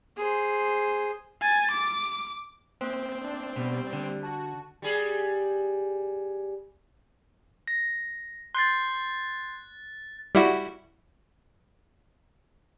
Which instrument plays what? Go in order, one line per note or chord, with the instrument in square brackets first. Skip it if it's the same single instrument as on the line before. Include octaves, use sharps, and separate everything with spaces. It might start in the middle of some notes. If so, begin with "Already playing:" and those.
[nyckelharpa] G#4 C5
[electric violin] G#5 A6
D6
[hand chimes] A#3 C5 F#6 [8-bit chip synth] C4
[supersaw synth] D4
[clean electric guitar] B2 [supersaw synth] G3
[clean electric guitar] D3
[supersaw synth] F#4 [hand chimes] A5
[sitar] G3 G#4
[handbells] A#6
[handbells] C6 G6 C7 [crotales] F#6 A6
[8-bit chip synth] G3 E4 F#4